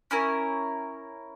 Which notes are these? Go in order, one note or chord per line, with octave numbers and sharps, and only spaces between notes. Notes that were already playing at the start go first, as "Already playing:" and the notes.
C#4 E4 A#4